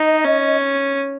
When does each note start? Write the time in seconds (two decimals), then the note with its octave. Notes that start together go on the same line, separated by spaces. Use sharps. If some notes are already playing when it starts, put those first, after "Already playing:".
Already playing: D#4 D#5
0.25 C#4